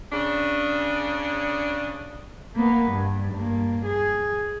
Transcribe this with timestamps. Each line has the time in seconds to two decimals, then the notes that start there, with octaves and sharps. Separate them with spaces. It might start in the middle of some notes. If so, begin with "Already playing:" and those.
0.11 C#3 D4
2.56 A#3 B3
2.91 G2
3.33 G2 A#3
3.85 G#4